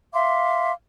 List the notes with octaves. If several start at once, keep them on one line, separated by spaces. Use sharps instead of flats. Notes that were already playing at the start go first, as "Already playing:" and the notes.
E5 F5 C6 D6